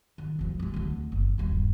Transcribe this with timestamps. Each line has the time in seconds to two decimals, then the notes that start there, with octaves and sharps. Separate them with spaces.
0.18 D#3
0.39 E2 F3
0.59 F#2 G#3
0.74 D2 D3
1.12 F#1
1.38 D#1 G2